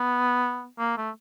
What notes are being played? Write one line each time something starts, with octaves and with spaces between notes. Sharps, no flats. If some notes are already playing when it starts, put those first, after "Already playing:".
Already playing: B3
A#3
A3